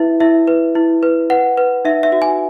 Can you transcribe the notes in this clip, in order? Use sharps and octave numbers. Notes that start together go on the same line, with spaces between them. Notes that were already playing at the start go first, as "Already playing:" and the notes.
Already playing: E4 B4 E5
E4 E5
B4
E4
B4
B4 F#5
B4
D#4 E5
E5
F#4
G#5